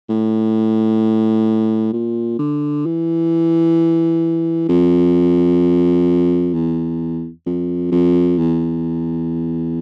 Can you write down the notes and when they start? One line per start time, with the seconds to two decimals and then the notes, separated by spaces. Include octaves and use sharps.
0.09 A2
1.93 A#2
2.39 D3
2.86 E3
4.69 F2
6.54 E2
7.46 F2
7.92 F2
8.38 E2